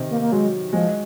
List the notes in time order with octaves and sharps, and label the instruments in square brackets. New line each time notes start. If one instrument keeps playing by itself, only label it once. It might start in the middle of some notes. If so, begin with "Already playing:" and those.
Already playing: [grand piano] C3 D#3
[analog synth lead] A#3
A#3
[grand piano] F#3 [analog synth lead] G#3
[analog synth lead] F3 [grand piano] G#3